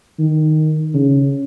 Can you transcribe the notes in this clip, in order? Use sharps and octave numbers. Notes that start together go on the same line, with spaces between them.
D#3
C#3